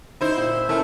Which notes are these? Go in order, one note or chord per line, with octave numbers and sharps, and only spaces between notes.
D#4 E4 C5
A#2
A3 C#4 E4 A#4